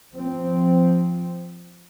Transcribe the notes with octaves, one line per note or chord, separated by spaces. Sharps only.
F3 C4